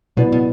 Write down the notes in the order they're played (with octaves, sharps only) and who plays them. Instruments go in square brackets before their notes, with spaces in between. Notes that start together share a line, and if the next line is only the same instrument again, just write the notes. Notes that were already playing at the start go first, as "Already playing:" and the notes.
[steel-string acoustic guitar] B2 [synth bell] F#3 B3 E4 B4 D5
[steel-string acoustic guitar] B2